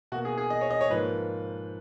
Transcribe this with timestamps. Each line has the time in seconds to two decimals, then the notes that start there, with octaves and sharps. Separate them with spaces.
0.12 B2 F#4
0.15 A#3
0.25 G#4
0.38 G#4
0.50 D#5
0.61 C#5
0.70 D#5
0.81 C#5
0.90 G#2 F3 A#3 B4